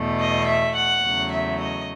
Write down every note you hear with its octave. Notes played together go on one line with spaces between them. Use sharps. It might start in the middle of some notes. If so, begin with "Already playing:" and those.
Already playing: E2 B2 A3
D#5
E5
F#5
E2 C#3 F#3 A3
E5
D#5